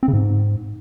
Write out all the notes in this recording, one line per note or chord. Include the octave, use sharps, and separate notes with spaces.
C4
C#3
G#2